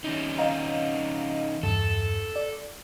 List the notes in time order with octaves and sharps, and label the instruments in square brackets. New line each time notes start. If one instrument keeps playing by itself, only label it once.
[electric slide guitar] D#3 C#4 D#4
[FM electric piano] D#5 F5 A#5
[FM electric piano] E2 G2 [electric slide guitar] A4
[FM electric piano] D5